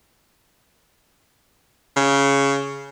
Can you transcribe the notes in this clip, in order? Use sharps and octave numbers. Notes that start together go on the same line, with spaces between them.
C#3